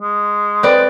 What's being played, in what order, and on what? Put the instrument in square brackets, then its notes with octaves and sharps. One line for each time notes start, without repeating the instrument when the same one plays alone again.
[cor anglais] G#3
[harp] C4 B4 D5